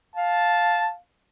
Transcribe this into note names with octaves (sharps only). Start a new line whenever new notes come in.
F5 A5